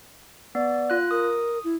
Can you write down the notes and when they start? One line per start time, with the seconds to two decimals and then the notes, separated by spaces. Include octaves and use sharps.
0.55 B3 D5
0.90 F4 F#6
1.11 A#4 D#6
1.64 E4